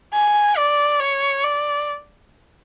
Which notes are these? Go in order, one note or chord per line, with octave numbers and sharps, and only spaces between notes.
G#5
D5
C#5
D5